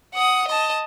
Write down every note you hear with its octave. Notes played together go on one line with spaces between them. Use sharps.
F#5 D#6
D#5 A5